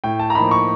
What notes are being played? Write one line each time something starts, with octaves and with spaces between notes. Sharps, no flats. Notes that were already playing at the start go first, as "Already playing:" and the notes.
A2 G5
A5
A#5
F3 A#3 D#4 B5
C#6